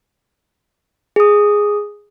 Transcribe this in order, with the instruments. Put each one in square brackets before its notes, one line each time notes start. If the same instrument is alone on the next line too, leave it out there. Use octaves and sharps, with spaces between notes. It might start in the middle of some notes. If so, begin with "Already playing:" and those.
[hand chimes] G#4 D#6